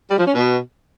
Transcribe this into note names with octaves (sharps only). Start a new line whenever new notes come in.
G3
F3
C#4
B2